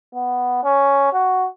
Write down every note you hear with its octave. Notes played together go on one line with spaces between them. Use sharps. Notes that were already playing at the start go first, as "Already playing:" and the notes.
B3
C#4
F#4